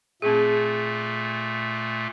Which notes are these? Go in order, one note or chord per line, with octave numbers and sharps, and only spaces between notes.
A#2 A3 C4 G#4